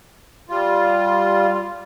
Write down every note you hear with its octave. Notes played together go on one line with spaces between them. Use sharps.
G3 F4